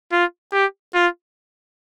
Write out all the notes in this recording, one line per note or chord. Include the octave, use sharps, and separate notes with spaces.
F4
G4
F4